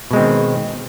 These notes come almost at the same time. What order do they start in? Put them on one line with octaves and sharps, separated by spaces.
B2 G#3 C4 D#3